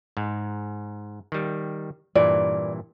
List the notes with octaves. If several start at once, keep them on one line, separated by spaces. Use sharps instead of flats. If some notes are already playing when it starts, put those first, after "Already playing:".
G#2
D#3 G3
G2 A#2 E3 D5